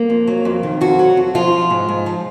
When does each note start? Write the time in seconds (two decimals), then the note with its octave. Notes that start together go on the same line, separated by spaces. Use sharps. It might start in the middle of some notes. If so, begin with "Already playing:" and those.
Already playing: A#3
0.10 F2
0.27 F#3
0.45 F2
0.63 D#3
0.81 F2 F#4
0.99 F#3
1.17 F2
1.35 F3 F4
1.53 F3
1.70 G#2
1.89 G#2
2.06 F3